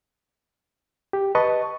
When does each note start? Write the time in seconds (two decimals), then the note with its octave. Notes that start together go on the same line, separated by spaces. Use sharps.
1.13 G4
1.35 B4 D#5 A5 C#6